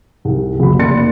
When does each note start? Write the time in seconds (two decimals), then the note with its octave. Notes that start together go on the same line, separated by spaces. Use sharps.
0.25 C2
0.60 F#1 B5
0.79 F1 A#3 D5 C6 A6 C#7